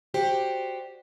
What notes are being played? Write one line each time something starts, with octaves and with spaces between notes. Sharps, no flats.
F#4 G4 C5 D5